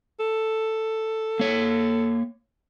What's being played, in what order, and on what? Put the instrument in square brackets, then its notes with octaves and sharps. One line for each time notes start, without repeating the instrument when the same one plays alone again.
[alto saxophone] A4
[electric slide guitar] A#3 C#5